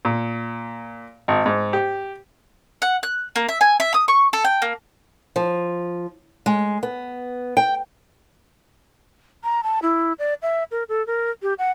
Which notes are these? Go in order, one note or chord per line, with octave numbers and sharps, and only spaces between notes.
A#2
G#1
G#2
G4
F#5
F#6
A#3
E5
G#5
E5
D#6
C#6
A4
G5
A#3
F3
G#3
B3
G5
A#5
A5
E4
D5
E5
A#4
A4
A#4
G4
F#5